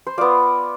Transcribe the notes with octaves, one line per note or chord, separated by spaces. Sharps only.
C5
B3 F4 D5